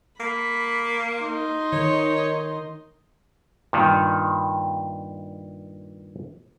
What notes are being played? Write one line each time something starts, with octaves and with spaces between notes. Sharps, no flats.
A#3 B5
D#4 C6
D#3 C#5
G2 A#2 D#3